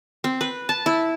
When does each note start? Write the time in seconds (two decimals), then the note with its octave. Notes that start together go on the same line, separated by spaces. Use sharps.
0.24 C4
0.41 B4
0.69 A5
0.86 E4